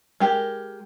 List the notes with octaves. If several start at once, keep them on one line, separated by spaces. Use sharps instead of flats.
G#3 G4 A#4